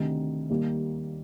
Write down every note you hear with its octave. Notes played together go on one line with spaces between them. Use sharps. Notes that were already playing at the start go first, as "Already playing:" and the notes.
Already playing: D2 C3 D#3
D#2 D#3 G3 A#3